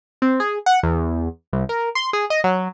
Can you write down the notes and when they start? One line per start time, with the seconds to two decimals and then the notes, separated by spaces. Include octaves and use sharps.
0.22 C4
0.40 G#4
0.66 F#5
0.83 E2
1.53 C2
1.69 A#4
1.95 C6
2.13 G#4
2.30 D#5
2.44 F#3